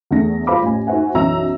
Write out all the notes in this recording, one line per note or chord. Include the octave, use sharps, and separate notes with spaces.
E2 A3 D4 A#6
F4 C5 F5 B5 D6
A1 G#5
D#4 F#4 C5 E5 F#5 G#5
B1 F#2 E3 E5 A#5 E6